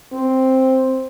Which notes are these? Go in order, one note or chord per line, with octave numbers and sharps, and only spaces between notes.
C4